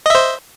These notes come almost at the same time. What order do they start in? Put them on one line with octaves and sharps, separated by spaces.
D#5 E5 C5